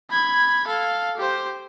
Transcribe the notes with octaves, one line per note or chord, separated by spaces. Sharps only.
B5 G#6
A4 F5
G4 C5